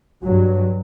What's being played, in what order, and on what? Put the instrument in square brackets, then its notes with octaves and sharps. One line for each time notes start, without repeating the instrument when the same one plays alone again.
[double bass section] G2 F#3